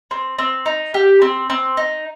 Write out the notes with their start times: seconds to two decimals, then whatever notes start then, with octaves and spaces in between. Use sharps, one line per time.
0.11 C4
0.38 C4
0.66 D#4
0.94 G4
1.22 C4
1.50 C4
1.77 D#4